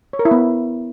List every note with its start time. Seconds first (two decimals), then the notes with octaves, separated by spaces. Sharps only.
0.13 C#5
0.19 A#4
0.25 E4
0.31 B3